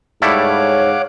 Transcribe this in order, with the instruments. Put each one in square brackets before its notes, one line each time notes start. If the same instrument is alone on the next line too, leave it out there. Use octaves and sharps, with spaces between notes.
[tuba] G#2 [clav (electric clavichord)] G3 A3 E4 [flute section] C#5 [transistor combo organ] F5 F#5 D6